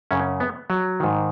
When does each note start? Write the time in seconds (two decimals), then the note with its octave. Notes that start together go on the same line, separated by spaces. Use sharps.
0.11 F#2 C#3 C#4
0.40 B3
0.70 F#3
1.00 G#2 D#3